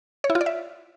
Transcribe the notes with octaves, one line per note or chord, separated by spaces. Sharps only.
C#5
E4
F4
D5
E5